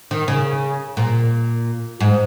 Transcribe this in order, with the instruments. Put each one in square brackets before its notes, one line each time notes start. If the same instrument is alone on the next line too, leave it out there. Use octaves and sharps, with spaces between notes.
[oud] D#3
C#3
A#2
G#2